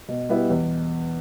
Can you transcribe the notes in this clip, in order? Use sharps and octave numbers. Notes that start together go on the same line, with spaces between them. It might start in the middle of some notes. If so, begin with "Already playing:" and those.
B2
G3 B3 E4
E2